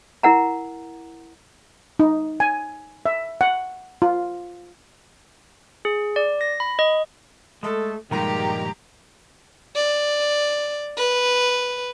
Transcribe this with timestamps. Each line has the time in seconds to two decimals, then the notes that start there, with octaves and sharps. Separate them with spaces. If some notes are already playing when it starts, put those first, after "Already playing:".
0.23 E4 A#4 F#5 A#5
1.99 D#4
2.40 G#5
3.06 E5
3.41 F#5
4.02 F4
5.85 G#4
6.16 D5
6.41 A#6
6.60 B5
6.79 D#5
7.63 G#3 A3 A4
8.11 G2 A#2 D3 D#3 F3 G#3 G4 A#5
9.76 D5
10.97 B4